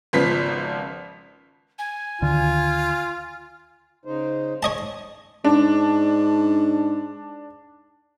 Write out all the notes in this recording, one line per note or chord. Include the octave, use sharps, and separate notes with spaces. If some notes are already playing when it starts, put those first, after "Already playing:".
G#1 C#3 F3 B3 B6
G#5
D2 D3 D#3 F4
C#3 D#4 C5
C#5 D#5 A5
G#2 D4